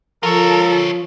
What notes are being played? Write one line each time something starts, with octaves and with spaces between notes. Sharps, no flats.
F3 F4 A4 A#4 C#5